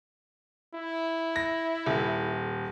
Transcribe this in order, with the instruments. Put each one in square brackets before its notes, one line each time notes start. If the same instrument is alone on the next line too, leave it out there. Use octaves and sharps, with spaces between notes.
[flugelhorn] E4
[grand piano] A#6
D#1